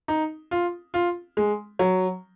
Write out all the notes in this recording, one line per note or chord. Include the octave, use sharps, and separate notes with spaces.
D#4
F4
F4
G#3
F#3